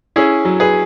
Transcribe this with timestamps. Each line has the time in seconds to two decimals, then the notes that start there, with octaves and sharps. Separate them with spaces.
0.16 C#4 E4 G#4
0.45 F#3
0.60 G#4 B4